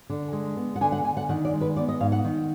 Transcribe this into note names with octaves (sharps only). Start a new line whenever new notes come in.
D3
G#3
B3
F#5
D3 G#5
F#5
D3 G#5
F#5
D#3 F#5
D5
G#3
B4
B3 D5
D#5
G#2 F5
F#5
D#3